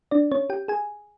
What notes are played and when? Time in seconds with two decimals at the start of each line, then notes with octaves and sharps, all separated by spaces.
0.11 D4 D5
0.32 C#4 C#5
0.50 G4 G5
0.68 G#4 G#5